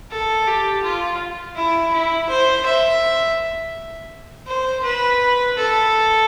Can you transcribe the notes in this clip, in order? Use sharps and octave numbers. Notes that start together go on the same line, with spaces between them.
A4
G4
F4
E4
E4
C5
E5
C5
B4
A4